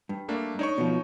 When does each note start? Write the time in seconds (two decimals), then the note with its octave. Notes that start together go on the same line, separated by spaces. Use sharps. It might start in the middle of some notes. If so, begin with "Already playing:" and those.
0.09 G2
0.28 A3 A#3 D4
0.59 D4 D#4 C#5 C#6
0.78 B2 F3